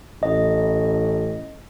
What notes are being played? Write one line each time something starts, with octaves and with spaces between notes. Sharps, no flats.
A1 D#5